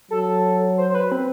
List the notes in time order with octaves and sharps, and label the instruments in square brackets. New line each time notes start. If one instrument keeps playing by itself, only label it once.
[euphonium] F#3 [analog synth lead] A4
[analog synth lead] C5
C5
B4
C4